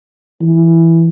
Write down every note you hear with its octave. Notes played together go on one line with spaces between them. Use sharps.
E3